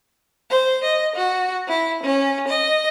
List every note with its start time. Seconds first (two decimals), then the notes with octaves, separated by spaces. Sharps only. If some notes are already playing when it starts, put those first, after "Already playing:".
0.50 C5
0.84 D#5
1.16 F#4
1.68 E4
2.03 C#4
2.48 D#5